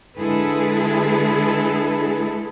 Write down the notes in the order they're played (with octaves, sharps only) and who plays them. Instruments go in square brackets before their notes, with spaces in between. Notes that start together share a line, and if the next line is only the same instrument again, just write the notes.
[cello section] D3 G#3 E4 G#4 A4 B4